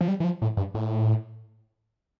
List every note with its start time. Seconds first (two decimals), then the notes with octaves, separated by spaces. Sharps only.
0.01 F3
0.08 G3
0.20 E3
0.24 F3
0.42 A2
0.57 G2
0.75 A2